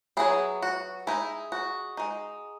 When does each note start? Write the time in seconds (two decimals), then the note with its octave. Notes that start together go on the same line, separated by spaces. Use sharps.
0.17 F#3 B3 E4 G#4
0.62 F#4
1.07 G#3 D#4 E4
1.52 F#4
1.97 G#3 D#4